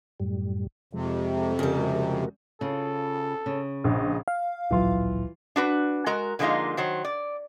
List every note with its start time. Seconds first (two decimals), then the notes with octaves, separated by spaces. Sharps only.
0.20 F#2 A2 G3
0.93 F2 C3 F3 G#3
1.59 C#3 G3 A#4
1.76 G#3 F#4 A#4
2.61 C#3 F4 A4
3.46 C#3
3.84 A#1 D#5
4.28 F5
4.71 D1 A#1 E3 F#3 F4
5.56 D4 F#4 B4
6.06 G#3 F#4 A#4 A#5
6.39 D3 F3 G#3 A#3 D#4 F4
6.77 D#3 F#3 C5
7.05 D5